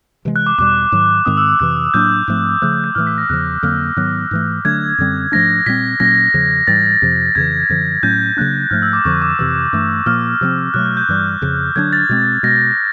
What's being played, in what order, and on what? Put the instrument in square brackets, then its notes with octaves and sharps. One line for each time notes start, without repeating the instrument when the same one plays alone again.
[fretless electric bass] C3 E3 G#3
[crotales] F#6
D6
[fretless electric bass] E2 B2 G3 [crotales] D6
[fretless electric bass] G#2 D#3 F#3
[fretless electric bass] G#2 D#3 G#3 C4 [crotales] D#6
[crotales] E6
E6
[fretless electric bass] F2 C3 E3 [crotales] F#6
[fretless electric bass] A2 F#3 A#3 D4 [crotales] G6
[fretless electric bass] G#2 F3 A3 C4
[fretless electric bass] C#3 F3 A3 [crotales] F#6
[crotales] F#6
G6
[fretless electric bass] A2 E3 A3 [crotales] F6
[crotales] B6
A#6
[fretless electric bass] E2 C#3 F3 [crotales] F#6
[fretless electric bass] F2 D3 F#3 A#3 [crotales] F6
[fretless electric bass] G#2 D#3 F#3 B3 [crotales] F#6
[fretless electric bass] G#2 E3 A3
[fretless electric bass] D3 F#3 A3 D4 [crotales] G#6
[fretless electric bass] F#2 D3 G3 C4
[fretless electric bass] G#2 F3 A3 D4 [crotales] A#6
[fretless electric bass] A#2 G3 C4 [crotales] B6
[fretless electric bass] A#2 F#3 A#3 C#4 [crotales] A#6
[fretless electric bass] E2 C#3 F3
[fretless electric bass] G#2 E3 G3 [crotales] A6
[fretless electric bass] F2 C3 F3
[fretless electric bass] F2 C#3 E3 [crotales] G#6
[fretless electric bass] F#2 D3 F3
[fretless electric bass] A2 F#3 A3 C#4 [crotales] G6
[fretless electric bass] C#3 F#3 A#3 D4 [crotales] F#6
[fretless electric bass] G#2 F3 A3 [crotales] F6
[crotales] E6
D6
[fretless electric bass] F2 D3 F3 [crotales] C#6
[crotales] D6
[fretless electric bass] F2 C3 E3 [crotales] E6
[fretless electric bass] G2 E3 A3
[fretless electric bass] A#2 F3 A#3 [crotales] F6
[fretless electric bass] C3 F3 A3 C4
[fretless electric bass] B2 F#3 A3 [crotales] F#6
[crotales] G6
G6
[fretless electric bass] G2 E3 G3
F2 C#3 F3
[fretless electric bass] D3 F#3 B3 D4 [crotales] G#6
[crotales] A6
[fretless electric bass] B2 G#3 C4
[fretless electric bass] B2 G#3 B3 [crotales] A#6